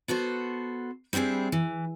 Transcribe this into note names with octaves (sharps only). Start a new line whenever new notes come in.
B3 F#4 A4 C5
G3 C4 D4 E4 G#4
E3